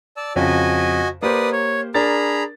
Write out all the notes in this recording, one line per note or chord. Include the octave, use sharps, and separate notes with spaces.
D5 A5 E6
F2 C#3 F#4 D#5 G#5
A#3 G4 B4 C5 D5 D#6
C#5
D4 G#4 A#4 A#5 B5 A6